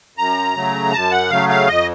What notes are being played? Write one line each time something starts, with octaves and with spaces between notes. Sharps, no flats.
F#2 A#5
C#3 F#3 A3
F#2 A5
F#5
C#3 F#3 A3 F5
F5
F2 D#5